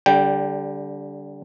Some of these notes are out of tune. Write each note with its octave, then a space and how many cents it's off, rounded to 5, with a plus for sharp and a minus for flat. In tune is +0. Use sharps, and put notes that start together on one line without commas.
D3 -25 G3 +0 G5 +0